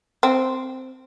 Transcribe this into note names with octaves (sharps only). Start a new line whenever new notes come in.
C4